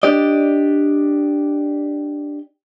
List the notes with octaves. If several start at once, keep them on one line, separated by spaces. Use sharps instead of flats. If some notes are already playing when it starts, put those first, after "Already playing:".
D4 G4 D5 D#5